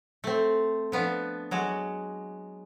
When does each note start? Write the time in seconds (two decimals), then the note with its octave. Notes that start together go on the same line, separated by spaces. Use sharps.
0.24 A3 C4
0.92 F3 B3 D4
1.51 F#3 G#3 F#4